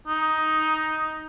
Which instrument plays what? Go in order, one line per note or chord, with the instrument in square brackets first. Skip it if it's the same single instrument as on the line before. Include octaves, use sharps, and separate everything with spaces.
[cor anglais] D#4